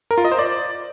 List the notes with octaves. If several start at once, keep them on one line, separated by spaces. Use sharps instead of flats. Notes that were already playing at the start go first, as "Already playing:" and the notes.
A#4
F4
D#5
C5
D5